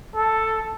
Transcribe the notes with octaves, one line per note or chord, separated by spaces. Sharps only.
A4